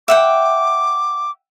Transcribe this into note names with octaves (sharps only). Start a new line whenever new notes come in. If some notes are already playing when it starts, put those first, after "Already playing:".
E5 F#5 G5 D6